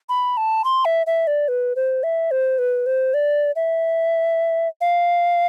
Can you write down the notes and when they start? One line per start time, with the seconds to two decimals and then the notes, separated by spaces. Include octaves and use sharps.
0.09 B5
0.37 A5
0.65 C6
0.85 E5
1.07 E5
1.27 D5
1.48 B4
1.76 C5
2.03 E5
2.31 C5
2.59 B4
2.86 C5
3.14 D5
3.56 E5
4.81 F5